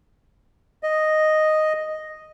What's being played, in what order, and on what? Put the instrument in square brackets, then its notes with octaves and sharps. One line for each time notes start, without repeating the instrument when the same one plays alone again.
[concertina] D#5